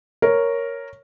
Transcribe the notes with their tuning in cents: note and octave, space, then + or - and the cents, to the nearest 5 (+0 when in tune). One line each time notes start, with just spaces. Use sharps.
A#4 +0 C#5 +0